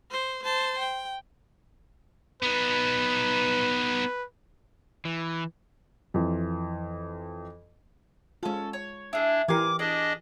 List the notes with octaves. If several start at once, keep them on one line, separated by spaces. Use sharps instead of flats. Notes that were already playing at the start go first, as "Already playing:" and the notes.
C5
C5 A5
G5
B3 D#4 B4
E3
F2 E3
G#3 C#4 F4 A4
C#5
D4 E4 G#4
E3 G4 A#4 G#5 C6 D6
D4 G#4 D5 D#5